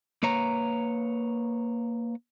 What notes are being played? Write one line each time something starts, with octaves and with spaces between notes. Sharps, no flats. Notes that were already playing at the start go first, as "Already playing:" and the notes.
A#3 B4 C#5 A#5